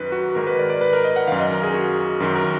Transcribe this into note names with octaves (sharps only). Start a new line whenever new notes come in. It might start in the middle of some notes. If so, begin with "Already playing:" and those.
Already playing: F#2 D#3 B4
F#4
G#2 D#3 A#4
B4
D5
D5
B4
A#4
D#5
F#5
F#2 D#3 F5
D#5
A#4
G#4
F#4
F#2 D#3 F#4
A#4